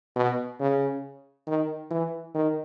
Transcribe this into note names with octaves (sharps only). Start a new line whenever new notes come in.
B2
C#3
D#3
E3
D#3